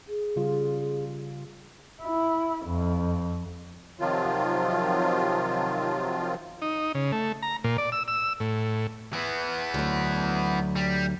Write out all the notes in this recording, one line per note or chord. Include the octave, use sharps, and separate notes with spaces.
G#4
C#3 G3 F4
E4
F2
C3 D#3 F3 F#3 F4
D#4
C#3
A3
A#5
A#2
D5
E6
E6
A2
E3 B3
D2 F#3
G3